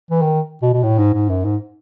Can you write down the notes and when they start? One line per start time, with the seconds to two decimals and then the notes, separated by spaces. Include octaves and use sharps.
0.11 E3
0.22 D#3
0.63 B2
0.73 B2
0.83 A2
0.98 G#2
1.14 G#2
1.30 F#2
1.45 G#2